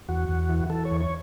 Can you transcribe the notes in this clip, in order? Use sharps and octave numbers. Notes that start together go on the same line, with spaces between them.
E2 F#4
E2
E3
E3 A4
C#5
E2
C#5